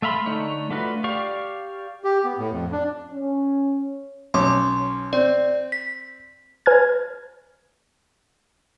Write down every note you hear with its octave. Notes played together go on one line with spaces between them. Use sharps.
A3 E5 F5 B5 C6
D3 A3 D#4 C#5
A3 D4 F4 F#4 B4
G4 D5 F5 C#6
G4
B3
A2
F2
D4
C#4
B1 C#4 C6 D6
C4 D5
B6
B4 G#5 F6 G#6